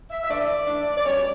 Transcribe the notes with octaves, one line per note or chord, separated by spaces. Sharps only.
E5
E5
E3 A3 D4 D5
E3 A3 D4
D5
B2 G3 C#4 C#5